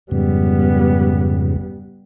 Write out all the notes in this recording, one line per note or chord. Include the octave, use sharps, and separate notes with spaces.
F2 G#2 C#3 G3 B3